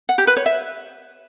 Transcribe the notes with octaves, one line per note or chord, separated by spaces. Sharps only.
F#5
G4
B4
C#5
E5